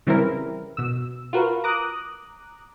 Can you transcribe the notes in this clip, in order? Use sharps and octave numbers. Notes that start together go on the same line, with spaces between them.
C#3 E3 G3 C4 E4 A#4
B2 E6
F4 F#4 A#4 B4
A#5 D6 D#6 F#6